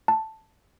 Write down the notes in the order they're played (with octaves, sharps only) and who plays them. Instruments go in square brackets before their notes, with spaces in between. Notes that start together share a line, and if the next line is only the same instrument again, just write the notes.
[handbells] A5